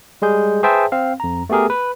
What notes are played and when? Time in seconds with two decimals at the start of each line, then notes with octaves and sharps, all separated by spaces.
0.22 G3 G#3 G#4 G6
0.63 G#4 B4 C5 E5 G5 A5
0.92 C4 F5
1.20 F2 A#5
1.50 A3 B3 G4 G#4 A#4
1.70 B4